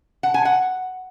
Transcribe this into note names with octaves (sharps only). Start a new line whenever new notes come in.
F#5
G#5
F#5